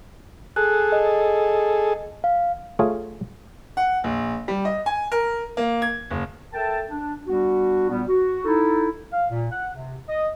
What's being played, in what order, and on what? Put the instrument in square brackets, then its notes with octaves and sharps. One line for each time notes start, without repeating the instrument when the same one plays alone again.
[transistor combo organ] G#4 A4 [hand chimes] F#6
[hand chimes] D#5
F5
[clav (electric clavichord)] A3 F4 G#4 C#5 G#5
[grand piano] F#5
A#1
G3
D#5
G#5
A#4
A#3
G#6
F#1
[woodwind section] A4 A#4 E5 G5 A5
D4
G3 B3 D4 F#4
A#2 G3 B3
F#4
D#4 E4 A4
F5
A#2
F#5
C3
D#5